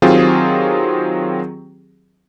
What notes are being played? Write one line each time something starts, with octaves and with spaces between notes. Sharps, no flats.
D#3 F#3 C4 F4 G4 G#4